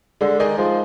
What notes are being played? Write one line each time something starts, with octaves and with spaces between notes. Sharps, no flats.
D3 G#3
D#3 D#4 G#4 D5
F3 G#3